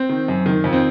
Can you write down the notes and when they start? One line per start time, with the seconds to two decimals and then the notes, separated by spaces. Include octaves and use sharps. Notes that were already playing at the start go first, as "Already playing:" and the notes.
Already playing: C4
0.09 D#3
0.28 F#2
0.46 D#3
0.64 F2
0.73 C4